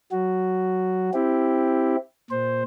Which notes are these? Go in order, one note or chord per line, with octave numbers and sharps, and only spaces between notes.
F#3 F#4
C4 E4 G4
A#2 C5